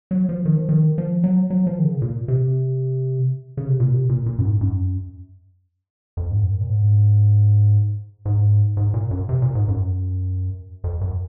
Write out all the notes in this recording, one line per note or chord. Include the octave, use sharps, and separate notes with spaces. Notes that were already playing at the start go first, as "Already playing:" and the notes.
F#3
F3
D#3
F3
D#3
F3
F#3
F#3
F3
D#3
C#3
A#2
C3
C#3
C3
A#2
C3
A#2
A#2
F#2
G#2
F#2
F2
G#2
F#2
A#2
G#2
G#2
G#2
A#2
F#2
C3
A#2
G#2
F#2
F2
F#2